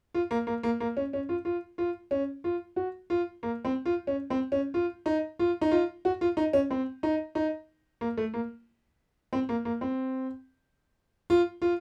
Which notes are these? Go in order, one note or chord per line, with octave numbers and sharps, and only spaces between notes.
F4
A#3
A#3
A#3
A#3
C#4
C#4
F4
F4
F4
C#4
F4
F#4
F4
A#3
C4
F4
C#4
C4
C#4
F4
D#4
F4
D#4
F4
F#4
F4
D#4
C#4
C4
D#4
D#4
A#3
A3
A#3
C4
A#3
A#3
C4
F4
F4